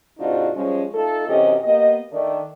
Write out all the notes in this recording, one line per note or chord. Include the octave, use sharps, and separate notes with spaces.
G#2 C3 D4 D#4 F4 F#4
F3 G3 G#3 C#4
A3 D#4 F4 A4
F#2 C3 E3 C#4 G4 D#5
A#3 B3 G4 D#5
D#3 A3 D4